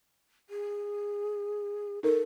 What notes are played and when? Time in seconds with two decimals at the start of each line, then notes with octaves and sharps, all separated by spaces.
0.50 G#4
2.03 D#4 A4 A#4